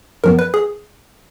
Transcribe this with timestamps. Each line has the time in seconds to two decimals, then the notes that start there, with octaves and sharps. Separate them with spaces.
0.24 F#2 F3 B3 A#4
0.39 B4
0.54 G#4